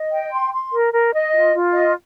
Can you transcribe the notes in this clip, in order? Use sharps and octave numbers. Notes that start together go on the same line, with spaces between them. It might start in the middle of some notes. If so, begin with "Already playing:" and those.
Already playing: D#5
G5
C6
C6
A#4
A#4
D#5
F4
F4
D#5